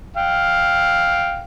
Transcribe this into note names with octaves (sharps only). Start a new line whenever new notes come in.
F5 G5